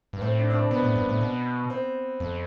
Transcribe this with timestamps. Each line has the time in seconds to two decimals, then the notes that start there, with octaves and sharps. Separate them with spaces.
0.13 G2
0.21 A2 C4
0.39 D4
0.50 D4
0.54 C4
0.71 B2 B3
0.83 A2
0.96 G2
1.09 A2
1.21 B2
1.70 C4
2.20 F2